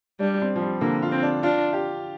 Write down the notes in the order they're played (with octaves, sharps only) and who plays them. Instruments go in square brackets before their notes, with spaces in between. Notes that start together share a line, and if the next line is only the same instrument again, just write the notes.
[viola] G3 [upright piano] D4
[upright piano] C4
F3
G3
[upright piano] D3 [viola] A#3
[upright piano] F4
[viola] C4
[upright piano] D4
[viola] D4 [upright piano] F4
[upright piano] G4